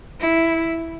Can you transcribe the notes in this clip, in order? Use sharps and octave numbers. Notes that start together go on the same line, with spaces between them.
E4